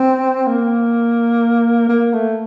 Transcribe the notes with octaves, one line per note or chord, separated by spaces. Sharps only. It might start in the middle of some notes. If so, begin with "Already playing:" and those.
Already playing: C4
A#3
A#3
A3